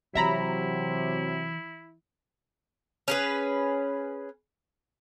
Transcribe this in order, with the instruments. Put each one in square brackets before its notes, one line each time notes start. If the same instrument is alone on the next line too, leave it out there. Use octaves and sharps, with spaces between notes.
[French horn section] C3 F#3 [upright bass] E3 [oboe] E4 [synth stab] E5 A#5 B5
[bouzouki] C#4 G#4 B4